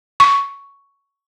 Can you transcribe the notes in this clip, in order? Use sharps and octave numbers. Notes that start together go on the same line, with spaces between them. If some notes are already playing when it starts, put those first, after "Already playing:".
C#6